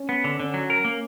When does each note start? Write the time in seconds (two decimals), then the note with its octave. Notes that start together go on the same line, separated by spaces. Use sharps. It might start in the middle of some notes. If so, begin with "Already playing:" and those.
Already playing: C#4
0.09 B3
0.24 D3
0.39 D3 C#4
0.54 F#3
0.70 A#4
0.85 A#3